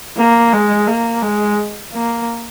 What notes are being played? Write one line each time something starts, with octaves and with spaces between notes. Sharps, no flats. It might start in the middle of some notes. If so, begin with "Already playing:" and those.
A#3
G#3
A#3
G#3
A#3